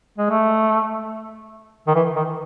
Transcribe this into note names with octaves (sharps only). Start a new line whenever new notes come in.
G#3
A3
D#3
E3
D#3